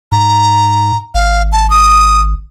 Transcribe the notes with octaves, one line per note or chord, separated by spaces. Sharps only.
G#2 A#5
G#1 F5
A5
D#6